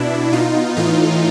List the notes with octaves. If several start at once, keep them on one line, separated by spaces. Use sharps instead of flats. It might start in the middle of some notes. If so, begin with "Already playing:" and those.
Already playing: B2 D4 E4
B2 D#4 F4
A2 E3 D#4 F4